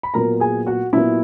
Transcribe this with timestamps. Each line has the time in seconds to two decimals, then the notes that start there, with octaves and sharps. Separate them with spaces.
0.03 B5
0.14 A#2 F#3 B3 A#4 A#5
0.40 G#4 G#5
0.67 F#4 F#5
0.93 A#2 F#3 B3 E4 E5